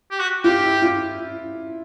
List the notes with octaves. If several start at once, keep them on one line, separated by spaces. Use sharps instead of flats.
G4
F#4
F4 G4
E4
F4